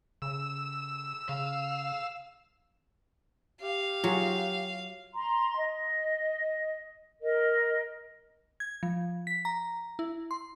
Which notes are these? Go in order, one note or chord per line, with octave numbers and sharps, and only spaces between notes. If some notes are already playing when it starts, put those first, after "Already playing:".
C#3 E6
C#3 F5
G4 F5
F#3 F4 F#4 G#4
A#5 C6
D#5
A#4 D#5
G#6
F3
B6
A#5
E4
C6